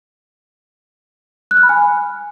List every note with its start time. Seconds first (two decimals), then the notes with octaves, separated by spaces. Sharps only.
1.51 F#6
1.57 F6
1.63 B5
1.69 G#5